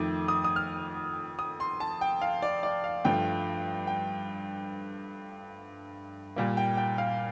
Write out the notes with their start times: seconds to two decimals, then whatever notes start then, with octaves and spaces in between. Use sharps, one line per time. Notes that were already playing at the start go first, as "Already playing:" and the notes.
Already playing: F2 D#3 A3 D6
0.28 D#6
0.44 D#6
0.56 F6
1.39 D#6
1.60 C6
1.80 A5
2.01 G5
2.22 F5
2.42 D5
2.63 D5
2.84 F5
3.05 G2 F3 A3 G5
3.87 G5
6.36 A#2 G3 A#3
6.57 G5
6.77 G5
6.98 F5